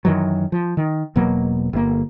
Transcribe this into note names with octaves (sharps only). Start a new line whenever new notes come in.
F#2 D#3 E3 F#3
F3
D#3
E1 B2 F#3 A#3
G1 A#3